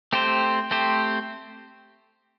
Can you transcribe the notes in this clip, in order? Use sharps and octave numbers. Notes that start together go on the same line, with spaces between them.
A3 C4 G4 C5
A3 C4 G4 C5